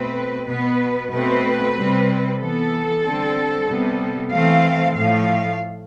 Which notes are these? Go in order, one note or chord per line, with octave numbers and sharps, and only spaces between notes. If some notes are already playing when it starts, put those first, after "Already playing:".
Already playing: B2 A3 C4 B4
B2 B3 B4
B2 A3 C4 B4
C3 G3 C4
E3 B3 A4
D3 G3 C4
C3 G3 B3
E3 A3 C4 F5
A2 F3 A3 F5